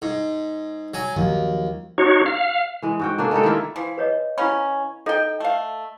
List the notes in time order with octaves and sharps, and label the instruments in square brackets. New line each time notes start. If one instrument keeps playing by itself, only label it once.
[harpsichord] G#2
F#3 G#5
[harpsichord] D#2 [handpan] F3 F#3
[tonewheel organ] D#4 F#4 C#5
F5
[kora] E3 G#3
G#2 F#4 G5
A#3 D4 G#4 A4
G#3 A#3 G4 A4
D#3 A#3 E4 F4
[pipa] E3 F3
[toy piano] B4 C#5 D#5
[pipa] C#3 C#4 [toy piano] E4 F5 B5
[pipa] D#4 G5 [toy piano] A4 D#5
[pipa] A3 F5